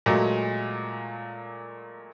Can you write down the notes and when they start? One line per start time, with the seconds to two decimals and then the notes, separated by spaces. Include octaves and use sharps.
0.06 A#2 F#3 G#3 A3